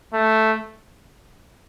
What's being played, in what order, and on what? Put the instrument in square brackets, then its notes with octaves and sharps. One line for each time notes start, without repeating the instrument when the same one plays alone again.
[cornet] A3